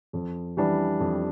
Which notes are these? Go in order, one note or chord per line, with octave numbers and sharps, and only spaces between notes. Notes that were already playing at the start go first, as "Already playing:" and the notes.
F2
E3 G3 D4
F2